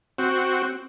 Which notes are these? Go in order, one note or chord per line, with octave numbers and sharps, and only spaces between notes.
C4 F#4